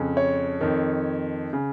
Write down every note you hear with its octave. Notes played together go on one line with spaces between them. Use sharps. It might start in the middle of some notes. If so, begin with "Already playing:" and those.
Already playing: F2 C#3
C#5
F2 D#3
C#3